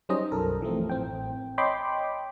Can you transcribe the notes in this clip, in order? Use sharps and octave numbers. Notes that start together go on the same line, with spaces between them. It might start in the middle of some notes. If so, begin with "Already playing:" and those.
F#3 G3 C#4 D#4 C5 D#5
B1 F#2 A4 A#4
E3 F3 A3 C4
A1 C4 G5
C#5 D#5 G5 B5 C6 D6